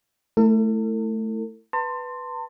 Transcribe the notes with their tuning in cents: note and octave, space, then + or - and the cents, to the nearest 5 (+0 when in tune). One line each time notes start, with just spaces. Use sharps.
A3 +0 E4 +0 A4 +45
B4 +0 A5 +40 C6 +0